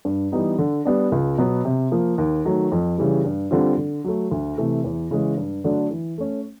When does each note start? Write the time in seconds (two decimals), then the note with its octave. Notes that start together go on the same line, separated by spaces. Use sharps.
0.05 G2
0.32 E3 G3 B3 D#4
0.58 D3
0.85 G3 B3 D4
1.12 C#2
1.38 B2 F#3 B3
1.65 C3
1.92 F3 A#3
2.18 D#2
2.45 D#3 F#3 A3
2.72 F2
2.98 C#3 E3 G3
3.24 G2
3.51 D3 G3 C4 F4
3.78 D3
4.04 F#3 A3
4.31 D2
4.58 C3 E3 A3
4.84 E2
5.11 C#3 E3 G#3
5.38 G2
5.64 D3 F#3 A3 D4
5.91 E3
6.18 A3 C#4